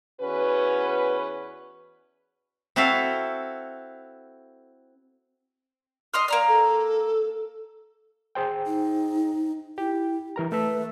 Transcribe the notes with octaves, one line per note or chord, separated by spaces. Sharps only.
E2 C#4 F#4 B4
C4 E4 F#4 A4 E5 F5
D#5 C6 F6
A#3 D5 A#5 F6
A4
G#4 C5 G5
D#4
E4 G4
E3 A#4 A#5
A3 B4 E5 E6